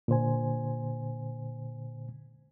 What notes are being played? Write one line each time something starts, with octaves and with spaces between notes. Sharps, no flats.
A#2 D3 C5 G#5